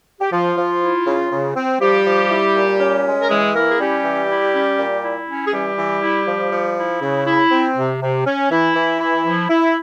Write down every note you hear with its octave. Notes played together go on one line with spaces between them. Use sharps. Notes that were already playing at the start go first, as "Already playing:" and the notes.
G4
F3 F4
F3
E4
C#3
C#3
C4
F3 G3 G4
F3
E4
A#2
C#4
G#3
A#4
E3 G#3 G#4
A#3 E4 A#4
G#4
G3 C#4 G4
E3
E4
C#4
A#2
E4
C#4
G#4
E3 G3 G4
E3
E4
F3
F3
E4
C#3
E4
C4
C3
C3
C#4
E3 E4
E3
E4
F3
E4